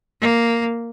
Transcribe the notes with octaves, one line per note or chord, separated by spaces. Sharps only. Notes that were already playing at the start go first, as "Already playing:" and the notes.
A#3